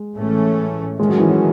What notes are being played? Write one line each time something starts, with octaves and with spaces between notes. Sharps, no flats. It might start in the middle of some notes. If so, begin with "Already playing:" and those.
Already playing: G#3
A2 E3 A3 C#4
D#3 G#3 A3 C#4
F#3
E3
F#3